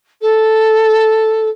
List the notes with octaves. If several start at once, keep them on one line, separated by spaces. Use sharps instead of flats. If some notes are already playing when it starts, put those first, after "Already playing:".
A4